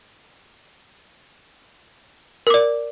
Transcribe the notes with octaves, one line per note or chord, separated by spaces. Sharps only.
A#4 D5 D6